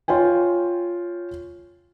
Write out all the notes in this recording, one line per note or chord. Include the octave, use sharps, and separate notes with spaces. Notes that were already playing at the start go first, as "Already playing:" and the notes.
F4 C#5 G5 G#5